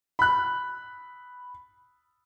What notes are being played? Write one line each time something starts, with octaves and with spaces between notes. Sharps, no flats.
B5 F#6